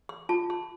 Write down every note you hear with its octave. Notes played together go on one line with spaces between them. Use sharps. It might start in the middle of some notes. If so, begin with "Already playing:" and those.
C6
F4 A5
C6